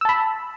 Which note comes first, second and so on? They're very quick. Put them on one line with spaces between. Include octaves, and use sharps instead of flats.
E6 A5 B5